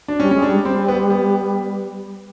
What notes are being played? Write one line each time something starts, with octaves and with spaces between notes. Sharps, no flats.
D4
G3 C#4
G#3 C#4
D4
G3
C4
B3
B3